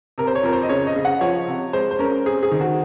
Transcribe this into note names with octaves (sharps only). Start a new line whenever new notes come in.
C3 A#4
C5
C#5
F2 A#4
C5
D#5
C#3 C#5
D#5
C#3
F#5
F3 C#5
C3
G#3 C5
C5
C#4 A#4
C4 G#4
G#4
D#3
F#4